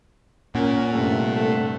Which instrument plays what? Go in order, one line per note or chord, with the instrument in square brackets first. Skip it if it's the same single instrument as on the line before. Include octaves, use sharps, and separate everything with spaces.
[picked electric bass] A#2 [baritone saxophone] C#4 [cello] A#4 [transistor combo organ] F#5
[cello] G2 C3 [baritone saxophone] A3
[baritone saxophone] A3